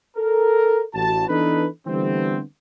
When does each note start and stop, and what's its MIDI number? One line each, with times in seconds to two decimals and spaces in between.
0.16 0.82 69
0.16 0.82 70
0.94 1.27 33
0.94 1.27 66
0.94 1.27 81
1.29 1.66 52
1.29 1.66 59
1.29 1.66 62
1.29 1.66 63
1.29 1.66 69
1.29 1.66 71
1.87 2.40 50
1.87 2.40 52
1.87 2.40 55
1.87 2.40 57
1.87 2.40 59
1.87 2.40 60